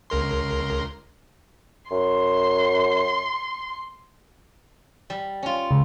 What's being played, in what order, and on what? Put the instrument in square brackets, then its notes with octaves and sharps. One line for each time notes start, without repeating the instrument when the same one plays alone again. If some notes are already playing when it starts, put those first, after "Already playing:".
[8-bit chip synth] C#2 A#4 C6
[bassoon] F#2 [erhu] C6
[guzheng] G3
C#4 F4
[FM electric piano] C#2